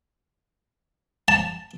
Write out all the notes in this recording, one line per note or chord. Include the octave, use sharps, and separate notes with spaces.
A5